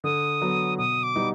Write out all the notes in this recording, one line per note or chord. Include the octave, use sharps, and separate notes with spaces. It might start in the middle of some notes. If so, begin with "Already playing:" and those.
D3 D#6
F#3 B3
B2 D#6
D6
G3 B3 D#4